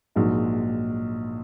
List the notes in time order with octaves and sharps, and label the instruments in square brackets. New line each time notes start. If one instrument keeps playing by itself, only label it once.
[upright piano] A#1 G#2 F#3